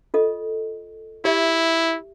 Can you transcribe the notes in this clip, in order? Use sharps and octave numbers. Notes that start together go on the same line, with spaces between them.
F4 A4 D#5
E4 G4 D5 E5